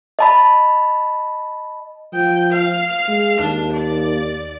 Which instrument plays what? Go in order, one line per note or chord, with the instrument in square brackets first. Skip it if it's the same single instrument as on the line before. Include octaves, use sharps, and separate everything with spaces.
[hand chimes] D#5 A5 B5
[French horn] F3 [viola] G5
[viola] F5
[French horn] G#3
[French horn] D#2 [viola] D4
[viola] D5